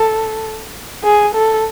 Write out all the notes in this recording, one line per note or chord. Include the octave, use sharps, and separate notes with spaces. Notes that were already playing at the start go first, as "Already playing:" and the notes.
Already playing: A4
G#4
A4